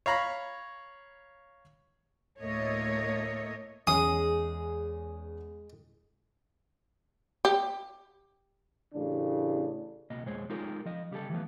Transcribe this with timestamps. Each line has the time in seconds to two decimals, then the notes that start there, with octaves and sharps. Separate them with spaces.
0.06 C#5 F5 A#5 B5
2.40 D2 A2 A3 A#3 C#5 D#5
3.87 E2 G#3 C#4 G#4 G#5 D#6
7.45 G4
8.94 A1 C#3 D4
10.10 C#2 B2 A#3 D#5
10.26 B1 F2 G#3 C5 C#5
10.50 G#3 D#4 F4 G4 A4 A#4
10.85 F3 D#5
11.11 C#3 G3 G4 A4
11.30 E3 F3 A3 B3